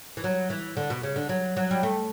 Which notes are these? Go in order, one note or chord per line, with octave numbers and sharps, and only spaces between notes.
E3
F#3
E3
D3
B2
C#3
D3
F#3
F#3
G3
A3